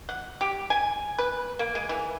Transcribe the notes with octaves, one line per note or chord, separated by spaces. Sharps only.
F#5
G4
G#5
B4
A#3
G#3
E3